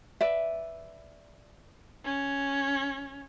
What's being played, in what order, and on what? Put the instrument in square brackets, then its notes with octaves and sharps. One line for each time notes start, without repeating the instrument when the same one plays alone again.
[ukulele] B4 D5 E5
[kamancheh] C#4